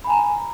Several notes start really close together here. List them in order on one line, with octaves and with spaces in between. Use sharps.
B5 G#5 A#5